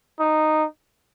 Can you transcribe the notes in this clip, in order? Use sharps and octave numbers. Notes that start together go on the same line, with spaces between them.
D#4